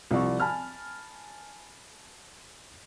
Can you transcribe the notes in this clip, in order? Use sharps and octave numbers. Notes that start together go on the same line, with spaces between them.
C2 F3 D5 C#6
G#5 A5 B5 F6